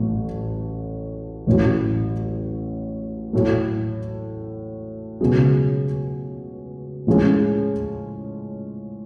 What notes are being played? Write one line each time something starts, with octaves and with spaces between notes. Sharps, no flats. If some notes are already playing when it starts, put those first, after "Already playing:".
Already playing: A1 A2 F#3 A3
A1 A2 F#3
A2 F#3 A3
C#2 B2 F#3 C#4 G#4
A2 F3 G#3 C#4 G#4